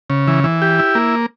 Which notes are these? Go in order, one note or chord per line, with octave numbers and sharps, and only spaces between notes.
C#3
E3
E3
G4
E4
A#3